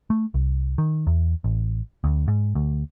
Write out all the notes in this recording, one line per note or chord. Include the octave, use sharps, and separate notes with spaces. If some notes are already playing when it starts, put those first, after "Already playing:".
A3
C2
D#3
E2
A1
D2
G#2
D2